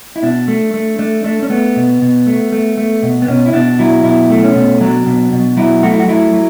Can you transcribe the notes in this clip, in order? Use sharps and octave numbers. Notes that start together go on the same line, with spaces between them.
E4
B2 D4
A3
A3
A3 D4
A3 D4
C#4
A3 B3
B2
B2
A3
A3
A3
B2
B3
B2 C#4
E4
B2 D4
F#3 E4
B2 E4
A3
C#4
B2
F#3 D4
B2
B2
F#3 E4
A3 F#4
E4
F#4
F#3 E4
F#3